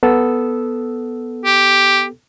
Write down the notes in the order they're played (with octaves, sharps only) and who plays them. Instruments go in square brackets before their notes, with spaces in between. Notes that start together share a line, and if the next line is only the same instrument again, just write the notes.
[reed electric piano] B3 A4 E6
[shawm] G4